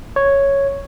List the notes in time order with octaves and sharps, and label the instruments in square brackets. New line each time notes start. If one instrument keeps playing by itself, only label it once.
[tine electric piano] C#5